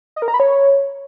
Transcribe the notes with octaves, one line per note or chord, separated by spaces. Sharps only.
D#5
A#4
A#5
B5
C#5